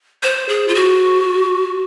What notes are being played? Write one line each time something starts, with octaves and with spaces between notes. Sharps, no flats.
C5
G#4
F4
F#4